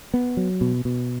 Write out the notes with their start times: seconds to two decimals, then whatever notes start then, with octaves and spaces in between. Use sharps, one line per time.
0.14 B3
0.37 F#3
0.61 B2
0.85 B2